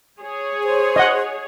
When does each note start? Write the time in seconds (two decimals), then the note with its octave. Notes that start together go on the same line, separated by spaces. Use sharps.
0.21 G#4 C#5
0.64 C5
0.96 D#5 F#5